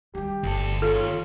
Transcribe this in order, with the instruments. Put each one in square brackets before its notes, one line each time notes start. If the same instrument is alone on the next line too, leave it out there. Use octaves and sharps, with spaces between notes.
[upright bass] D#3 G3 [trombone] G4
[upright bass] G1 [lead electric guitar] D2 A4
[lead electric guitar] D#3 C#5 [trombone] F4 [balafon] A4